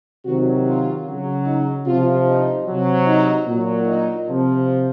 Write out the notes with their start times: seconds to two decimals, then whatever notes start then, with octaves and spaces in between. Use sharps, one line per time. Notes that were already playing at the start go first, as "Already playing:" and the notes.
0.25 C3 D#3 F#3 F#4
0.66 F4
1.06 C#3 F#3
1.46 D#4
1.86 C3 F3 F4
2.26 D#4
2.66 C3 F#3
3.07 D#4
3.47 A#2 F#3
3.87 D#4
4.27 C3 F3